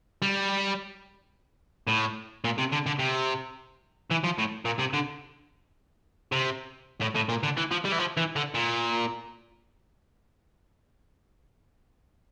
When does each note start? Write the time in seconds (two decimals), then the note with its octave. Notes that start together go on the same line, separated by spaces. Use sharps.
0.22 G3
1.88 A2
2.44 A#2
2.58 C3
2.72 D3
2.86 D3
2.99 C3
4.11 E3
4.24 F3
4.39 A2
4.65 A#2
4.79 C3
4.94 D3
6.32 C3
7.01 A2
7.15 A2
7.29 A#2
7.43 D3
7.57 E3
7.71 F3
7.85 G3
7.92 E3
7.99 F3
8.17 E3
8.36 D3
8.54 A#2